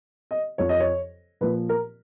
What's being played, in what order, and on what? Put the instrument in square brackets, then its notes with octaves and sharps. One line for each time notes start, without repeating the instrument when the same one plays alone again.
[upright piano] D#5
F2 F3 C#5
D#5
C#5
A#2 F3 B4
A#4